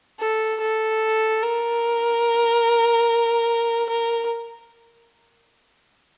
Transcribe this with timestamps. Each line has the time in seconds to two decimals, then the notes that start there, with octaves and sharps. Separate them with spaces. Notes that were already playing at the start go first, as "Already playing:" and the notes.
0.20 A4
0.61 A4
1.43 A#4
3.89 A#4